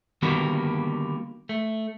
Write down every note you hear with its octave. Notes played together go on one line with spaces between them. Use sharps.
D3 D#3 G3 A#3 B3 F#4
A3